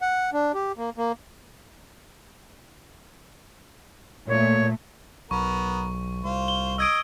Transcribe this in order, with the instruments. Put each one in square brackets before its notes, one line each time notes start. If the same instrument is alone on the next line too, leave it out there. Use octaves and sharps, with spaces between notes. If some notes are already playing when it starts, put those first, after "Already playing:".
[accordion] F#5
D4
G4
A#3
A#3
[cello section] A#2 A3 [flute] C#5
[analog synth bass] B1 [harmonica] B3 A#4 [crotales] C#6
[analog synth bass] C2 [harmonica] F4 C5
[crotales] G7
[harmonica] D#5 [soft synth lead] D#6 [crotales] E6 G#6 D7